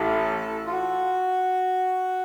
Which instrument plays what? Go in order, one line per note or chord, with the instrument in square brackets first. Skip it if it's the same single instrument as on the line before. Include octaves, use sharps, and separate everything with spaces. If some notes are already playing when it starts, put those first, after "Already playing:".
Already playing: [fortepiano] A1 [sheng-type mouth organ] A4
[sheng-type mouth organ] F4
F#4